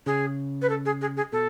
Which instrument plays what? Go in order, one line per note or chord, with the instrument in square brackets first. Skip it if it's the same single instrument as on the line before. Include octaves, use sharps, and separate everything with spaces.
[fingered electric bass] C#3 [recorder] G#4
[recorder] B4
A4
G#4
G#4
G#4
[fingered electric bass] B2 [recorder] A4